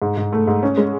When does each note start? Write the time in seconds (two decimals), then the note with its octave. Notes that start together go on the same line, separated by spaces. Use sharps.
0.02 G#2
0.17 G#2
0.32 A3
0.47 G#2
0.63 C#4
0.77 G#3